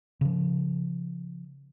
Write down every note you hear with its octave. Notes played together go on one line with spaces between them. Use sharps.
C#3 F3